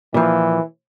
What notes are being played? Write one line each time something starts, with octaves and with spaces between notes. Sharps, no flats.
A#2 E3 F3